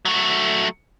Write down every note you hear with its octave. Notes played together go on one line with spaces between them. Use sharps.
F#3 A3